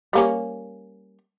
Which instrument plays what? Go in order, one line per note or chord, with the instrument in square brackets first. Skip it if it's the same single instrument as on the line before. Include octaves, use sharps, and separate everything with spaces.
[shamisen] G3 A#3 C#4